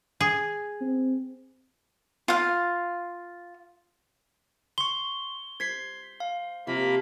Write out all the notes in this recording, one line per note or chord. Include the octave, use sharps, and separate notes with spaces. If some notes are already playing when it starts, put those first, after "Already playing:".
G#4
C4
F4 F5
C6 C#6 G7
C5 G#6 B6 C7
F5
C3 F3 A#3 B5